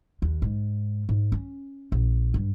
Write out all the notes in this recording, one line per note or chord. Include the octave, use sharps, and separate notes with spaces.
D#2
G#2
G#2
C#4
A#1
G2